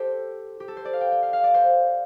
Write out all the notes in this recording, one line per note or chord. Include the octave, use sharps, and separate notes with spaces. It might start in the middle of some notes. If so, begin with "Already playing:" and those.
Already playing: G4 A4 C5
G4
A4
C5
D5
F5
G5
G5
F5
F5
D5
C5